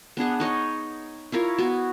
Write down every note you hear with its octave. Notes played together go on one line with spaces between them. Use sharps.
B3 D4 G#4 F#5
D#4 C#5 D#5
E4 F4 A#4 C#5
B3 F#4